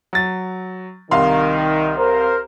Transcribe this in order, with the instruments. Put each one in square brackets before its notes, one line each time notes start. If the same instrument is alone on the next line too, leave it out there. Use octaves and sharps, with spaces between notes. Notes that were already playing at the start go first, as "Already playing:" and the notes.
[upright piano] F#3 A6
[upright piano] C2 F5 C6 [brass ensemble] D#3
[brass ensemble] A#4 C5